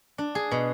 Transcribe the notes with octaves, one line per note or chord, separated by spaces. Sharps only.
D4
G#4
B2